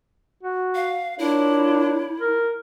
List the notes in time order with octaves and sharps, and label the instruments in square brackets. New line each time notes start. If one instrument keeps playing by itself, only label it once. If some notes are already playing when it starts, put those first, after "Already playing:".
[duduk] F#4
[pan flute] F5
[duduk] D4 [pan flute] E4 [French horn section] F4 A#4 C#5
[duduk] A#4